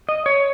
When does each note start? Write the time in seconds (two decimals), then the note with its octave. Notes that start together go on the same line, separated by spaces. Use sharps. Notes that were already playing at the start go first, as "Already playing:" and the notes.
0.09 D#5
0.26 C#5